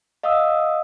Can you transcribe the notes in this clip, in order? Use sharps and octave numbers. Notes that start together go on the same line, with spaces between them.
D#5 F5 F#5 D#6 E6